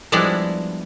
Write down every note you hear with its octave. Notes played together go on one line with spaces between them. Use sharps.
F3 G3 G#3 B3 D4 E4